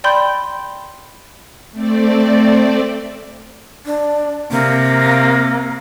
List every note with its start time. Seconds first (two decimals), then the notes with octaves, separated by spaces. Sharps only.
0.04 D5 G5 B5 C6 G6
1.72 A3 C4 D5
3.85 D4
4.51 C3 A#3